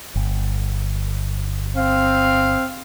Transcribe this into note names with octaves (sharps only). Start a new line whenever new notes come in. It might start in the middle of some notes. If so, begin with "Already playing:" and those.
G1
C4 F5